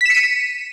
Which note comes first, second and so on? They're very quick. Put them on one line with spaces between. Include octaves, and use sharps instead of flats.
B6 E7 C#7 D#7